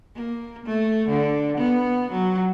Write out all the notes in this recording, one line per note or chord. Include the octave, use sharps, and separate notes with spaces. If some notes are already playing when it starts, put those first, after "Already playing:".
A#3
A3
D3
B3
F#3